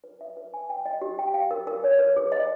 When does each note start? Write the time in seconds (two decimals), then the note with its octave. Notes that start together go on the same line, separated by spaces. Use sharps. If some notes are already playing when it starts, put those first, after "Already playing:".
0.04 B4
0.21 E5
0.37 B4
0.54 G#5
0.70 G5
0.85 D#5
1.01 G4
1.19 G5
1.34 F5
1.51 A#4
1.67 A#4
1.84 C#5
1.99 B4
2.16 G#4
2.32 D#5